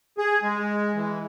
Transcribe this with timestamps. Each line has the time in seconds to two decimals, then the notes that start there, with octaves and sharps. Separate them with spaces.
0.18 G#4
0.43 G#3
0.95 E3